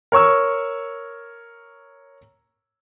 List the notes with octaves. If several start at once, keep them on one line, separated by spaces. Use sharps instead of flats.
A#4 C#5 C#6 E6